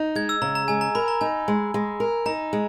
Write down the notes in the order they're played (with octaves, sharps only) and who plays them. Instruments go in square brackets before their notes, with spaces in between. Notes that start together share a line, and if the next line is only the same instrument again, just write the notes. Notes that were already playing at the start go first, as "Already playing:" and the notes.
Already playing: [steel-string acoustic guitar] D#4
[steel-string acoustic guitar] G#3 [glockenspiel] G#6
[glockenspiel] E6
[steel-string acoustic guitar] C#3 [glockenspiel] A#5
[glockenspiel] A#5
[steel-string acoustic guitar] G#3 [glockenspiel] G#5
[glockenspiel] A#5
[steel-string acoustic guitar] A#4 [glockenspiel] B5
[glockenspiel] A#5
[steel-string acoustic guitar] D#4 [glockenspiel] G#5
[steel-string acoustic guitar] G#3
G#3
A#4
[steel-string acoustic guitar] D#4 [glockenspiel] A#5
[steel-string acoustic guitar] G#3